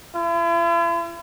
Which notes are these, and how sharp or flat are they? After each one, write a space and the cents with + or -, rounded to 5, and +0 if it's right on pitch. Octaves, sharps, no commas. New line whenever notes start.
E4 +45